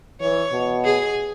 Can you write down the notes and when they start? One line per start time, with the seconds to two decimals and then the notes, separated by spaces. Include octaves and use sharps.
0.20 E3 C#5
0.52 B2
0.84 G#4